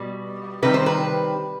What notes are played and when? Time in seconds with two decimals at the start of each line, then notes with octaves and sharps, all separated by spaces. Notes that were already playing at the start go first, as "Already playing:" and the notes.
Already playing: B2 G3
0.62 C3 D#3 G3 B4
0.74 C5
0.86 B4